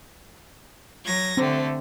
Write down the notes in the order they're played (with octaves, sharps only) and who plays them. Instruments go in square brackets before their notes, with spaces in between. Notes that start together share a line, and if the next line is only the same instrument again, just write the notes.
[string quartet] F#3 G#6 A#6
[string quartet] D3 A3 [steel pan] C4